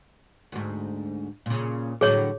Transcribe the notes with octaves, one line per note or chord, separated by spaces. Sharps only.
D2 G#2
A#2 C#3
A2 D3 F#3 G#4 C#5